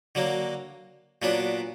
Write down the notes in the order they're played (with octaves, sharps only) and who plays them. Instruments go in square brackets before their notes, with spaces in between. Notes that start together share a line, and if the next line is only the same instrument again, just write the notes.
[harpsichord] D3 F#3 A#3
A#2 F#3 B3 D4